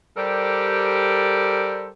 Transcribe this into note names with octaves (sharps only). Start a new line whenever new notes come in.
G3 G4 A4 A#4 C5 D5